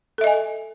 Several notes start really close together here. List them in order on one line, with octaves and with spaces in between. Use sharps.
A4 E5 D#5 G#5